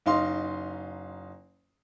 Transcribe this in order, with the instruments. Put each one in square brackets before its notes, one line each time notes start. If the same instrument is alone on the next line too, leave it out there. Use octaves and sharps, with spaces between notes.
[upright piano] F#1 D#4 F5 C6